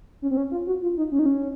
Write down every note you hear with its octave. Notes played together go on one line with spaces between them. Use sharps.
C#4
C4
C#4
F4
F#4
F4
D#4
C#4
D#4
C#4